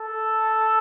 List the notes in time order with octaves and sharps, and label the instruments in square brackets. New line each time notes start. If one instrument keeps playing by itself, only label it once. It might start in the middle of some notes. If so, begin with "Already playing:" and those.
Already playing: [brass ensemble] A4